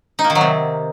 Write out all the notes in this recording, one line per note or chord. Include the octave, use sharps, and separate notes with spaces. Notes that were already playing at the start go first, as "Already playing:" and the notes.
D#4
A#3
D#3
F#3
C3